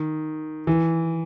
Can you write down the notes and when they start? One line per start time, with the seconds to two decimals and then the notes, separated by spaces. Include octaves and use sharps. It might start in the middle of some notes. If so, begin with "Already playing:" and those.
Already playing: D#3
0.67 E3